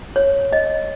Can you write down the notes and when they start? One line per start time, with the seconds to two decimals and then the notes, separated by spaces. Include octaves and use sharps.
0.16 C#5
0.53 D#5